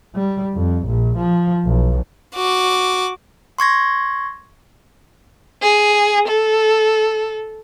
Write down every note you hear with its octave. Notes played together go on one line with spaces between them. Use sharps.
G3
F2
A#1
F3
B1
F#4 D6
C6 C#6 G#6 A#6
G#4
A4